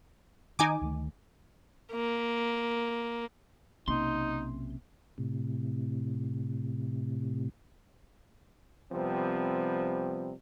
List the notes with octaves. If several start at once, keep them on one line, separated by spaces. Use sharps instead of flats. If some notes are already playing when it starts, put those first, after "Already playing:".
D#3 D#4 G#5 D6
D2 D#3 A3
A#3
B1 C3 A#3 C#4 D#4 C6
A2 C3
C3 F3 G3 B3 C4